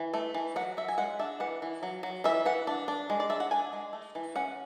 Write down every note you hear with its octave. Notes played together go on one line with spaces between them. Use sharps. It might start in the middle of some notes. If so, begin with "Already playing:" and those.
Already playing: E3
A3
E3
F#3 F#5
F#3 E5
G#5
G#3 F#5
D4 E5
E3 F#5
E3
F#3
F#3
E3 E5
E3 F#5
D4
D4
G#3
D5
D4 E5
F#5
D4 G#5
G#3
A3
E3
C#4 F#5